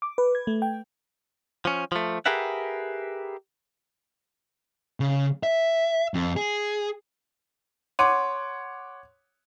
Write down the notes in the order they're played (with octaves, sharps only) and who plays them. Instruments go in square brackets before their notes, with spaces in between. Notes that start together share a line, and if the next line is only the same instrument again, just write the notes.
[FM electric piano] D6
B4
G#6
A3
G5
[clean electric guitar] F3 C#4
F3 A3
G4 G#4 A#4 B4 E5 F#5
[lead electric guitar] C#3
E5
F2
G#4
[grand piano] C#5 F#5 D6 [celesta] C6 D#7